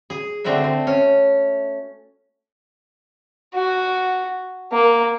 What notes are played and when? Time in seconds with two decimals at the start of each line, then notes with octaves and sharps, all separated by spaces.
0.10 G#4
0.44 D3 A3 C4 F#4 E5
0.64 C4
0.87 C#4
3.54 F#4
4.72 A#3